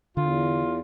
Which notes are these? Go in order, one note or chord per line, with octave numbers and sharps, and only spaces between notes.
E2 D3 F4